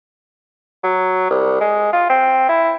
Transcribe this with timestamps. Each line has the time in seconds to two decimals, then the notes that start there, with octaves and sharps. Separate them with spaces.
0.83 F#3
1.30 C2
1.61 G#3
1.93 F4
2.09 C4
2.49 E4